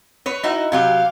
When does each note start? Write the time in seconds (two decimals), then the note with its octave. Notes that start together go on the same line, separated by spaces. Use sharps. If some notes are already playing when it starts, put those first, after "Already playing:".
0.26 B4 C#5
0.43 D#4 E4 F#4
0.72 C3 F#3 G4 F5